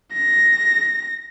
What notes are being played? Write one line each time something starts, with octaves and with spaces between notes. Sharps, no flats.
A#6